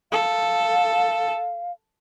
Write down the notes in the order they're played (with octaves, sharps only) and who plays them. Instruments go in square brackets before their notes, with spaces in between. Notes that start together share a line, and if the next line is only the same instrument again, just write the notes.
[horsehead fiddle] A4 [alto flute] F5